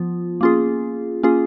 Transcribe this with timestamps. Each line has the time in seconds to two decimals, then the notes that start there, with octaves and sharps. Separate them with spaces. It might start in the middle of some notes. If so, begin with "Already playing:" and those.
Already playing: F3 B3 F4
0.41 A#3 C#4 F4 G#4
1.23 A#3 C#4 F4 G#4